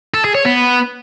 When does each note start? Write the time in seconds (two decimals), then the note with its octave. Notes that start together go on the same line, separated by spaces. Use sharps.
0.14 A4
0.24 G#4
0.35 C#5
0.45 B3